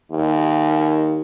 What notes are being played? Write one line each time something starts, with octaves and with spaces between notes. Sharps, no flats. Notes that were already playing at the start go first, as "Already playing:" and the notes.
D#2